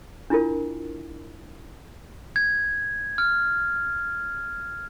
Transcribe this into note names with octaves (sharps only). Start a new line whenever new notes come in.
D4 E4 F4 A#4
G#6
F6